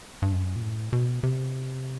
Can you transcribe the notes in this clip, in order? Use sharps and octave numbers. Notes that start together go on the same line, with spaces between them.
G2
F#2
A#2
A2
B2
C3